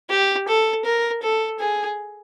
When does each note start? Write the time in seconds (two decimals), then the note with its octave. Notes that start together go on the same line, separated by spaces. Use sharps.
0.10 G4
0.48 A4
0.85 A#4
1.23 A4
1.59 G#4